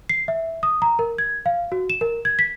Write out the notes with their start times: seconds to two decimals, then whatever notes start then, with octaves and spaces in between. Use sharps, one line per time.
0.09 C7
0.28 E5
0.63 D#6
0.82 A#5
0.99 A#4
1.18 G#6
1.46 F5
1.72 F#4
1.90 E7
2.01 A#4
2.25 G#6
2.39 B6